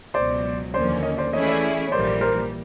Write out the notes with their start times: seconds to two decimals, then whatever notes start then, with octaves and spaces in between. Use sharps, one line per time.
0.14 C#2 B2 F#3 C5 D5
0.74 D#2 D3 F3 A#3 C#4 C5 D5
1.03 C#5 D#5
1.18 C5 D5
1.33 E3 A3 C#4 E4 G#4 C#5 D#5
1.47 D5 E5
1.87 C#5
1.92 A#1 G#2 E3 G3 A#3 C5 D5
2.21 A#4 C5